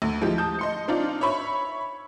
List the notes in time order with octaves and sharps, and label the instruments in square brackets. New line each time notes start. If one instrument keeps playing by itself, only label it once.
[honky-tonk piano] D2
F3 G#3 E4 G4
A5 D#6 G6
D#5 C6 C#7
C4 D4 D#4 F4 D5
C#5 E5 B5 C#6